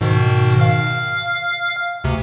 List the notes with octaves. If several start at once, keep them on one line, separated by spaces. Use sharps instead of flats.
G#2 B2 D#3
F5 F6
D2 C3